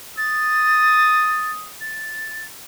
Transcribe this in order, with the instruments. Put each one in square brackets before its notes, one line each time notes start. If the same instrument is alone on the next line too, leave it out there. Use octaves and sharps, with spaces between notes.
[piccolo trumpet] D#6 [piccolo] A6
[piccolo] A6